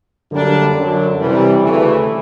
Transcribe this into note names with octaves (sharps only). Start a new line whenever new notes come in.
F#2 D3 G3 A#3 D4
F#2 D3 F#3
C3 E3 G3
D2 C#3 E3 A3